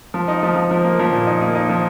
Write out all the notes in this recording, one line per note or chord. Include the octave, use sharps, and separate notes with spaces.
F3
D#4
F3
F3
F3
A#3
F3
A#2
D#4
A#3
D#4
F3